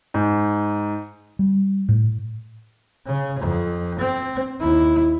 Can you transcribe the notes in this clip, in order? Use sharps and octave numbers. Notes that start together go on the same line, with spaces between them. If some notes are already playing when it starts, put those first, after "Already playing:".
G#2
G3
A2
C#3
F2
C4
D#2 E4